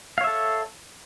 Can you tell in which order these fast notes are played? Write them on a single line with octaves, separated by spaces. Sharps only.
F5 C#5 E5 A4